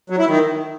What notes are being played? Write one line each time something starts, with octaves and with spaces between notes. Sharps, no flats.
F#3
E4
D#3